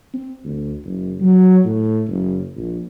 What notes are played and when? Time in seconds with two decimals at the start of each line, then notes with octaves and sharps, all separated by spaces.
0.13 C4
0.44 D2
0.84 F#1
1.20 F#3
1.65 A2
2.08 F#1
2.56 A#1